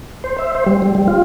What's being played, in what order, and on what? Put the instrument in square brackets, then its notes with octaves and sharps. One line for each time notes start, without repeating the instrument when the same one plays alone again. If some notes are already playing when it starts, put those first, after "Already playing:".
[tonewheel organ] C5
E5
C5
G3
G3
G3
F4